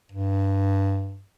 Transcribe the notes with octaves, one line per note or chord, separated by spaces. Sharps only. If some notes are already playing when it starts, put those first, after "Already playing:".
G2